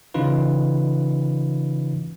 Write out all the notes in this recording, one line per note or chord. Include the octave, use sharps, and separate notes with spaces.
C#3 E3 C#4 D#4 F4 B4